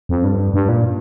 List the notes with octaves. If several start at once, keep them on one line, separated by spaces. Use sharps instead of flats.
F2
G2
G2
A#2